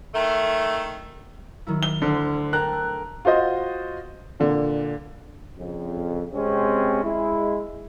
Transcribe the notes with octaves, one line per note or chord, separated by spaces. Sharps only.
D#3 A3
D#3 F#3 E4
G7
D2 D3 C5 F6
A#4 G5 A5 A#5 F#6
A3
F4 F#4 C5 D#5
A#2 D3
F2 C#3
C3 G#3 C4 C#4
G#3 E4